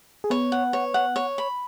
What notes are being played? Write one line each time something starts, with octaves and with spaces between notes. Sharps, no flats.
G#4
B3 B4 C#5
F#5
C#5
F#5
C#5
B5